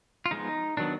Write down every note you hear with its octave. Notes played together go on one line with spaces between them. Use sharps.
F4
F3 G#3 B3 D#4
D#3 F#3 B3 D4